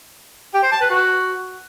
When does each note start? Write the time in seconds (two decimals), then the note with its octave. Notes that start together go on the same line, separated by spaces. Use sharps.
0.54 G4
0.63 C5
0.72 A5
0.81 B4
0.90 F#4